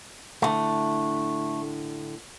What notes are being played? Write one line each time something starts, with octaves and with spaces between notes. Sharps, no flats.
A2 D3 A3